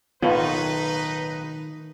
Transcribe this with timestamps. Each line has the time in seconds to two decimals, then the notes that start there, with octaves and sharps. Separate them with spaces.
0.23 B1 A2 D#3 B3 D#4 F4 B4